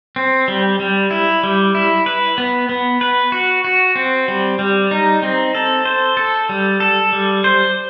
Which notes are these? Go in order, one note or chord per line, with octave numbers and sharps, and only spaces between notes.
C4
G3
G3
E4
G3
E4
B4
B3
B3
B4
F#4
F#4
C4
G3
G3
D#4
C4
A4
C5
A4
G3
A4
G3
C5